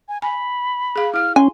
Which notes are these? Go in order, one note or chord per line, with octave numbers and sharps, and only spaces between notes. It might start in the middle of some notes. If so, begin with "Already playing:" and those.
G#5
G#5 B5
G#4 F5
E4 F5 F6
C#4 G#5 C6